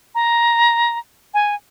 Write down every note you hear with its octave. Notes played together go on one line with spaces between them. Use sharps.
A#5
G#5